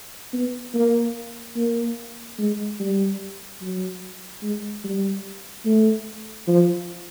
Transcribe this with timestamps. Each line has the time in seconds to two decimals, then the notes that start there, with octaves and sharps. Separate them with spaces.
0.33 B3
0.74 A#3
1.56 A#3
2.39 G#3
2.80 G3
3.61 F#3
4.43 G#3
4.84 G3
5.66 A3
6.48 F3